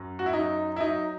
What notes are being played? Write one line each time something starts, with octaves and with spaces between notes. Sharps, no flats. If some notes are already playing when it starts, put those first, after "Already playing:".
Already playing: F#2 F#3
F#4
E4
F#3 D#4
E4
F#3 D#4